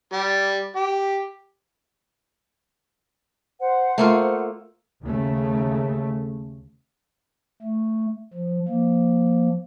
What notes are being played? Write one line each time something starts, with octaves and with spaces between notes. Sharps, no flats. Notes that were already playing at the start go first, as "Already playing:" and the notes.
G3
G4
C5 F#5
A3 A#3 F4
D#2 C#3 A3
A3
F3
F3 A#3